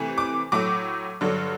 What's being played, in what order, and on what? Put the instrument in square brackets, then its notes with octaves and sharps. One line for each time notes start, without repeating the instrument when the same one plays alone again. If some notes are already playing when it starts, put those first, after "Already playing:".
Already playing: [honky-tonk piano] C3 E3 A3
D6
A2 F#3 A3 D6
G2 D3 F#3